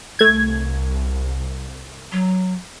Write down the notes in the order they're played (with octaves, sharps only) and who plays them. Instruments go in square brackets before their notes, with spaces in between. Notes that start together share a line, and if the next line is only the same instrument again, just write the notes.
[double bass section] C2 [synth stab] A3 G#6
[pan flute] F#3